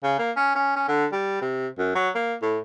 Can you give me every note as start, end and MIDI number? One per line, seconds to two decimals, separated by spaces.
0.03 0.16 49
0.19 0.31 58
0.36 0.54 61
0.55 0.75 61
0.76 0.83 61
0.88 1.06 50
1.12 1.41 55
1.41 1.67 48
1.78 1.94 42
1.95 2.10 54
2.15 2.34 58
2.42 2.58 45